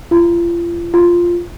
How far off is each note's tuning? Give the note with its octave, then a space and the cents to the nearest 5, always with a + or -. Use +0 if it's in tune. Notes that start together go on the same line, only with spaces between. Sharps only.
F4 -35
F4 +0